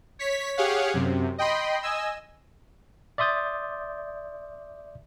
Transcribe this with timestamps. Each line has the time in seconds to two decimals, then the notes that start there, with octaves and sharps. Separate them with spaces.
0.19 C#5 B6
0.57 G4 G#4 C#5 F5 F#5
0.94 F#2 C3
1.38 D#5 G5 B5 C6
1.83 D#5 G#5 E6
3.18 D5 E5 C6 D#6 G6 A6